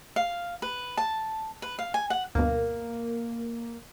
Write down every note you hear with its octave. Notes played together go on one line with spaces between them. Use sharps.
F5
B4
A5
B4
F5
G#5
F#5
D2 G2 B2 A#3